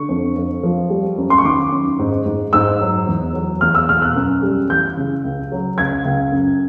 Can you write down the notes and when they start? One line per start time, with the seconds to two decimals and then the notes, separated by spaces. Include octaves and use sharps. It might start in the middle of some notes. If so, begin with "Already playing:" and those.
Already playing: D3 C#6
0.09 F2
0.37 F2
0.63 F3
0.90 G3
1.17 F#2
1.30 C6
1.38 C#6
1.45 D#3 D6
1.72 F#2
1.99 G#2
2.26 G#2
2.53 G#2 E6
2.81 F#3
3.07 E2
3.34 F#3
3.61 E2 F6
3.75 E6
3.89 B2 F6
4.02 F#6
4.15 F#2
4.43 G3
4.70 E3 G6
4.97 C#3
5.25 C#2
5.52 F#3
5.78 C#2 G#6
6.05 C#2
6.32 F#2